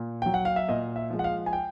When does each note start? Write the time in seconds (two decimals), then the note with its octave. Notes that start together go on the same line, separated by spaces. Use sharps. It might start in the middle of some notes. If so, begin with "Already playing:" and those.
Already playing: A#2
0.22 F#3 G5
0.34 F#5
0.45 F5
0.56 E5
0.69 A#2 D#5
0.96 E5
1.10 F3 G#3
1.19 F#5
1.24 F5
1.46 G#5
1.53 G5